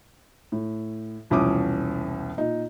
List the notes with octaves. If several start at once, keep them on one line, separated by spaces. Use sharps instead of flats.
A2
E1 C2 F3 C#4 D6 D#6
A#2 D#4